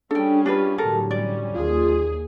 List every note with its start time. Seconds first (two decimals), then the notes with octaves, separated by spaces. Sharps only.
0.11 G3 C#4 D4 G#4 A4 G5
0.46 D4 F4 G4 B4
0.78 A2 D3 F#3 A4 A#4
1.11 G3 C#4 D5
1.55 D#2 F4 G#4